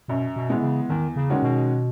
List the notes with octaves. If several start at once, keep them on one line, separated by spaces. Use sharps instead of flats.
F#2 B2
B2
E3 G#3 B3
C#3
E2 D#3
C#3
D#3 G#3 C#4 F#4
B2